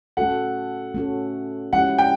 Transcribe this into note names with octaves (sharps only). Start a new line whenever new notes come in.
A3 C#4 F#4 A4 F#5
A3 C#4 F#4 A4
F3 G#3 C#4 E4 G4 F#5
G5